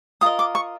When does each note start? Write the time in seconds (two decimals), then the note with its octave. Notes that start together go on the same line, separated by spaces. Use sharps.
0.21 F4 A#4 D#5 D#6
0.39 D6
0.55 C#6